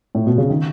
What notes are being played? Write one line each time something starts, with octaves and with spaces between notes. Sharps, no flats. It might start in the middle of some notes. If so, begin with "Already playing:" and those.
A2
B2
C#3
D#3